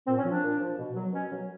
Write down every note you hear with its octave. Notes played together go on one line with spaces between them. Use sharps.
A#2 C4
C#4
F3
D4
A#2
F3
B2
F#3
B2 C#4
F#3